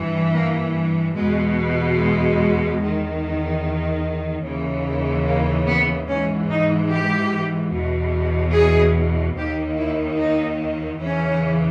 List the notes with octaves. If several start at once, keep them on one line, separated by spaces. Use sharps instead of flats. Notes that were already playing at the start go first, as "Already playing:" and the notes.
Already playing: G2 E3
A#3
E2 B2 G#3
G#3
E2 D#3
D#2 C#3 E3
A#3
B3
G#2 E3 C#4
D#4
G4
E2 B2
G#4
D#2 D#3 G4
E4
D#4
E2 C#3 E3 C#4